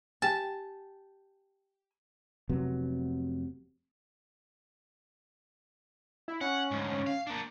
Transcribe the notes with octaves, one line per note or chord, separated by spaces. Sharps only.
G4 G#5 A5
F1 C3 F#3 B3
E4
C#4 F#5
D2 G#2
F5
A#3 D4